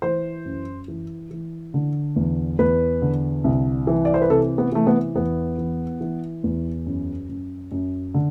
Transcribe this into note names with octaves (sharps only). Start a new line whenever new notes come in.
E3 C5
F#2
E3
E3
D3
E2
E2 B4
D3
C2
E3
D5
C5
B4
C3 A4
B3
E3 A3
B3
E2 B3
E3
E3
E2
F#2
F#2
F#2
D3